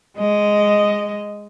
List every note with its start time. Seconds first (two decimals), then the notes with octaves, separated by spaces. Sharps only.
0.17 G#3 D#5